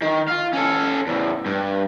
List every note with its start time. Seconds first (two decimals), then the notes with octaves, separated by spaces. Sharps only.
0.02 D#3
0.29 F4 F5
0.54 C#4 A4
1.07 E2 A2
1.46 G2